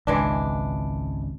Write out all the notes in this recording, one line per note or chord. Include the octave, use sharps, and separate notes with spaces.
G#1 C#2 E3 G#3 D4